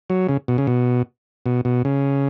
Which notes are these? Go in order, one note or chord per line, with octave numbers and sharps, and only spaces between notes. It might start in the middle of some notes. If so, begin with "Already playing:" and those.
F#3
C#3
B2
C#3
B2
B2
B2
C#3